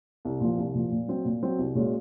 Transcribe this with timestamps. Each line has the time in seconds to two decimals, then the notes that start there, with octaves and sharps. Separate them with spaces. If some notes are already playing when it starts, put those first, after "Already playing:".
0.25 C2
0.41 A#2 F3
0.57 C2
0.74 A#2 F3
0.91 A#2
1.08 F#3 C4
1.25 A#2
1.42 F#3 C4
1.59 C2
1.75 A#2 G#3 C#4 F#4